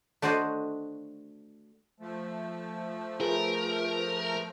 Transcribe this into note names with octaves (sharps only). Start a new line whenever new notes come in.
A3 D4 F#4 C5 D5 D#5
F3 A3
F4 G#4 A#4 B4